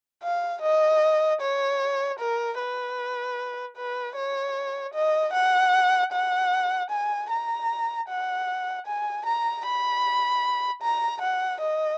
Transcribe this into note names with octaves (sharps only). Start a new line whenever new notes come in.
F5
D#5
C#5
A#4
B4
B4
C#5
D#5
F#5
F#5
G#5
A#5
F#5
G#5
A#5
B5
A#5
F#5
D#5